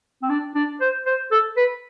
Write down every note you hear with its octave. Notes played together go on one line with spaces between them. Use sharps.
C4
D4
D4
C5
C5
A4
B4